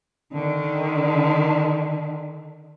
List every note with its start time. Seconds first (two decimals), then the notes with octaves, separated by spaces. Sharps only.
0.33 D3 D#3